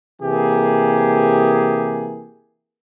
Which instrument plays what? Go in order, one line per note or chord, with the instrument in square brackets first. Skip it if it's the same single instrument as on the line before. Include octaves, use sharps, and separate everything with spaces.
[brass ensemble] C3 E3 A#3 G4 G#4